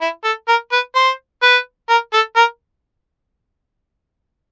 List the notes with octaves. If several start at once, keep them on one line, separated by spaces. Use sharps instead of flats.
E4
A4
A#4
B4
C5
B4
A#4
A4
A#4